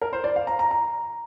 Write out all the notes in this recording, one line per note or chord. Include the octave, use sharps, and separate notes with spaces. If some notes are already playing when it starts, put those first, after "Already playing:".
A#4
C5
D5
F5
A#5
A#5
A#5